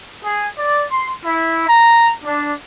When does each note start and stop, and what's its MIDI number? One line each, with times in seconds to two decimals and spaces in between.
0.23 0.47 68
0.57 0.83 74
0.89 1.11 84
1.24 1.64 64
1.67 2.13 82
2.23 2.53 62